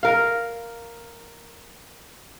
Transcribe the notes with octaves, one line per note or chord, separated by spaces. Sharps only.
A#4 F5